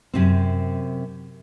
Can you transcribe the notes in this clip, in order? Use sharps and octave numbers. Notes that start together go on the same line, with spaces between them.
F#2 C3 C4